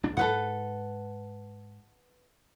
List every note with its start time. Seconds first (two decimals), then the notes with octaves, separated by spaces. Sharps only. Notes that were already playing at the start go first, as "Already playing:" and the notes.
0.03 A#1 D4
0.17 G#2 A4 B4 F#5